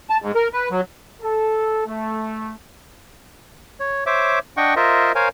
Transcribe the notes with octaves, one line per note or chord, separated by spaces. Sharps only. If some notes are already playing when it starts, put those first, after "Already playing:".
A5
G#2
A#4
B4
F#3
A4
A3
C#5
C5 C#5 E5 D6
D4 D#5 F#5 G5 C#6
F4 A#4 C5 D#5 E5
A#4 C5 C#5 F5 G#5